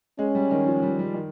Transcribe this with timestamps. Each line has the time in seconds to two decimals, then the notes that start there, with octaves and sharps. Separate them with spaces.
0.19 G#3 C#4
0.35 G3
0.51 D#3
0.66 F3
0.82 G3
0.99 G3
1.14 D#3